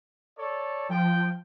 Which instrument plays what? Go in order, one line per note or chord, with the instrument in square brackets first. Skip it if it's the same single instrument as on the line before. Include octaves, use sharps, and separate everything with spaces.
[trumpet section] A4 C#5 D5
[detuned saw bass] F3 [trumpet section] G5